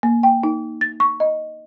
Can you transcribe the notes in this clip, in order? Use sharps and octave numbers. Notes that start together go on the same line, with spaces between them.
A#3
G5
D#4
A6
C#6
D#5